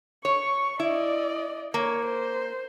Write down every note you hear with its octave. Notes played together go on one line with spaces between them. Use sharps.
C#5 C#6
E4 D5 D#5
A#3 C#5
C5